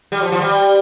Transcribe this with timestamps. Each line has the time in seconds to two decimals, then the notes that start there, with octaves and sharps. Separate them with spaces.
0.12 G3
0.22 F3
0.32 F3
0.41 G3